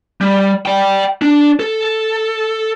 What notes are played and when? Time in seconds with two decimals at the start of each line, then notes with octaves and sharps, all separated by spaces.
0.21 G3
0.66 D5 G5
1.22 D4
1.60 A4